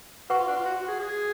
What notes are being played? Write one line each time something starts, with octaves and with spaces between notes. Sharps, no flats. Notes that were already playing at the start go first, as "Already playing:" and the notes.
F#4 B4 F#5 C#6
F4
D4
F4
F#4
F#4
G#4
G#4